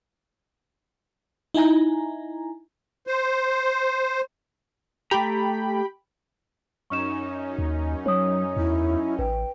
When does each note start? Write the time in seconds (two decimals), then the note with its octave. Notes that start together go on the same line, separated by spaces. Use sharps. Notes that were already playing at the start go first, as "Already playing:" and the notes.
1.54 D#4 E4 G#5 A#5
3.07 C5
5.11 A3 G4 G5 A#5 B5
6.90 F#2 C#4 D#4 C#6 F6 E7
7.58 D#2
8.06 F#3 C#5 D#6
8.57 E2 E4
9.19 A1 B4 G5